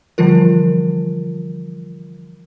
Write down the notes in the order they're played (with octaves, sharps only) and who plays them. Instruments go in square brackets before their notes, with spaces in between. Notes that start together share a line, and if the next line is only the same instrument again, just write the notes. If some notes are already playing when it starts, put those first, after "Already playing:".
[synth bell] D3 E3 F3 G3 F4 A#4